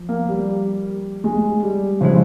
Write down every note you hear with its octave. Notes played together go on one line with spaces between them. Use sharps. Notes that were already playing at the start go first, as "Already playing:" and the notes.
Already playing: F3
A#3
G3
G#3
G3
C#3 E3 F3 G#3